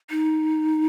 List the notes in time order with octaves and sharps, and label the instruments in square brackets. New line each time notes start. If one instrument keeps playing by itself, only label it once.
[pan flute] D#4